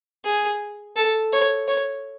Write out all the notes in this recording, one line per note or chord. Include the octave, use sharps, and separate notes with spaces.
G#4
A4
C#5
C#5